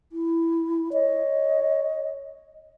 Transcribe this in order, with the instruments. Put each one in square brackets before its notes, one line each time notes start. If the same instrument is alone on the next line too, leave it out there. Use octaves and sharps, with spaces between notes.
[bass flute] E4
[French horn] C#5 [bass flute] D#5